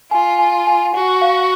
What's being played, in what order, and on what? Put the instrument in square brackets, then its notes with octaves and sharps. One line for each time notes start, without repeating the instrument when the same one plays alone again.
[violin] F4 [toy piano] G#5
[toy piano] G#5
G#5
[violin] F#4 [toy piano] F#5
[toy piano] F5